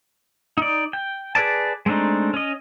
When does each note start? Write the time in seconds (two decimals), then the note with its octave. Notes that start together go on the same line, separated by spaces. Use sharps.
0.58 D#4 D5
0.93 G5
1.35 G#4 B4 D5 A5
1.86 G#3 A3 C4 D4 D#4
2.34 C#4 D#5